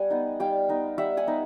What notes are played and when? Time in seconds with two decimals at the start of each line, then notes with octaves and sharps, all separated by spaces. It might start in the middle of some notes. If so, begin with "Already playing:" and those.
Already playing: G3 F#5 G#5
0.10 B3 D#4
0.40 G3 F5 G5
0.69 B3 D#4
0.98 G3 E5 F#5
1.17 F#5 G#5
1.27 B3 D#4